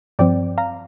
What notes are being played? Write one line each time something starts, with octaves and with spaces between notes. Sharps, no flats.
G2 F3 C4 D5 G5
F5 A#5